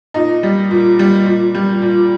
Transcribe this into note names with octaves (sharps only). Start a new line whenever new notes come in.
A#2 D#4
G3
A#2
G3
A#2
G3
A#2